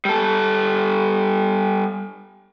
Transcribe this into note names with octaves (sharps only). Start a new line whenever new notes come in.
G3 A4